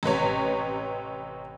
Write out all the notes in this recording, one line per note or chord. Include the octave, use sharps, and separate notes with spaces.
A1 C3 B4 C#5